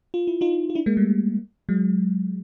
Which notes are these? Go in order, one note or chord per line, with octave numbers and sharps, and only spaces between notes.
F4
E4
D#4 F4
F4
D4 E4
G#3 A#3
G3 A3
F#3 G#3